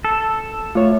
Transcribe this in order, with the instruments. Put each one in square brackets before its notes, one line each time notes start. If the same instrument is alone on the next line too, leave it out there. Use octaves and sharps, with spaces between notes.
[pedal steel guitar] A4
[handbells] A3 [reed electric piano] F4 C#5